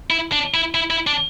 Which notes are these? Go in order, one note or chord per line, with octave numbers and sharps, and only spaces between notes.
E4
D4
E4
E4
E4
D4